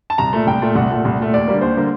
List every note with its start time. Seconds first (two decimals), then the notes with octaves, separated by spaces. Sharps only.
0.10 A5
0.18 C2 A#5
0.33 A#2 A3
0.47 C2 G5
0.62 A#2 A3
0.75 C2 F#5
0.91 A#2 A3
1.05 C2
1.19 A#2 A3
1.34 D#2 D5
1.48 D3 G3 A#3
1.61 D#2 C5
1.77 D3 G3 A#3